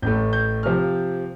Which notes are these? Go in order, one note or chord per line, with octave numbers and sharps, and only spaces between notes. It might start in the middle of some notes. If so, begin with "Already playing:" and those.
A1 A2 A3 G6
G6
C3 F3 F6